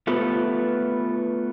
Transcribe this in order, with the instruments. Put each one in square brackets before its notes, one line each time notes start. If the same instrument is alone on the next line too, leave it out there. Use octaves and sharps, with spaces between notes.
[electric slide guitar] A3 B3 F4 G4 A4 B4